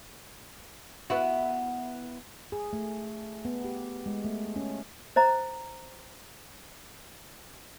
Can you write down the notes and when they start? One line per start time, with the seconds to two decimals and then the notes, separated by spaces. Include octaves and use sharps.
1.10 B3 E4 F#4
2.52 G#4
2.73 A3
3.45 B3
3.64 G4
4.06 G#3
4.24 A3
4.56 C#4
5.16 C5 D#5 A#5